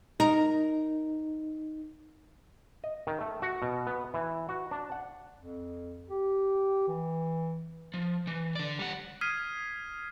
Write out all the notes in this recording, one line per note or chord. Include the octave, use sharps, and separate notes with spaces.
D#4 A#4
D#5
D#3
A3
F#4
B2
B3
E3
F#4
D4
F#5
F2
G4
E3
F3
E3
D3 D5
G3 F#5
D#6 F6 G#6 B6 C7 D#7